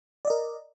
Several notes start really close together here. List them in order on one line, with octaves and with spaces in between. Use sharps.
D5 D#5 A#4